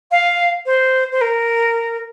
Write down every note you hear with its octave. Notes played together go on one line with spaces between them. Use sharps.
F5
C5
C5
A#4